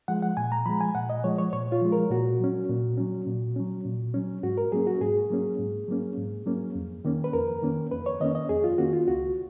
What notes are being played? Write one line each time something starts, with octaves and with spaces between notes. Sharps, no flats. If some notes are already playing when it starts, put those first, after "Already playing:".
F3 G#3 F#5
F#5
A#2 G#5
A#5
F3 G#3 B5
G#5
A#2 F#5
D#5
F3 G#3 C#5
C#5
A#2 C#5
F4
F3 G#3
A#4
A#2 F#4
F#3 C#4
A#2
F#3 C#4
A#2
F#3 C#4
A#2
F#3 C#4
G#2 F#4
A#4
F#3 A#3 C#4 G#4
F#4
G#2 G#4
F#3 A#3 C#4
G#2
F#3 A#3 C#4
G#2
F#3 A#3 C#4
F2
D#3 A#3 C#4
B4
F2 A#4
D#3 A#3 C#4
F2 B4
C#5
D#3 A#3 C#4 D#5
D#5
F2 G#4
F4
D#3 A#3 C#4 F#4
F4
C#2 F#4